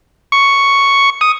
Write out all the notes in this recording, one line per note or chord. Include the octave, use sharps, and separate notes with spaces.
C#6
D#6